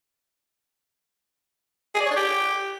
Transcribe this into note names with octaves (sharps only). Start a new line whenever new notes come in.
G#4
D5
C#5
D4
G4